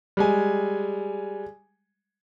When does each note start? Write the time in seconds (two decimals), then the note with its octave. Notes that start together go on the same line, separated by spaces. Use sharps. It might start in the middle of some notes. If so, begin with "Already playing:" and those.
0.17 G3 G#3 G#5